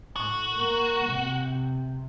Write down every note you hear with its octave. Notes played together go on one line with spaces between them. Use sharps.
A2 F#4
A#3
C3